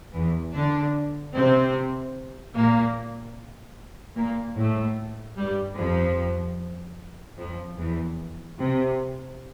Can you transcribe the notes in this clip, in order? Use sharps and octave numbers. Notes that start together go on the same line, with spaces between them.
E2 E3
D3 D4
C3 C4
A#2 A#3
A#2 A#3
A2 A3
G2 G3
F2 F3
F2 F3
E2 E3
C3